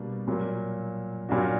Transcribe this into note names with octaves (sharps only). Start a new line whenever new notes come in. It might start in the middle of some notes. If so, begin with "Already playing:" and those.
Already playing: B2 G3 A#3 D4
A#2 F#3 A#3
A#2 F#3 A#3 D4 F#4